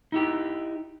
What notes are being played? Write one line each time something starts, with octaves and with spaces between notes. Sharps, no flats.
D#4 E4 G4